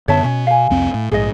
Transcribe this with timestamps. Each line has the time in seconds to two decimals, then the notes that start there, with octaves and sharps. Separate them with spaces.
0.08 F#2 D3 B3 C#5 E5 A5
0.24 B2 C#4
0.47 F5 G#5
0.70 C2 F2 C4
0.94 A2
1.12 A#1 G#2 G#4 D#5